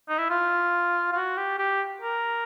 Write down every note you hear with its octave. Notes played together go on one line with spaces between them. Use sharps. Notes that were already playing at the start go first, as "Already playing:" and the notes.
D#4
E4
F4
F4
F#4
G4
G4
A#4